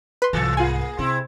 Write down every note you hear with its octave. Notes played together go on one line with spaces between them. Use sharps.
B4 C6
C2 G#2 E3 A4
A#3 F4 G#4 G#5
C3 C4 E4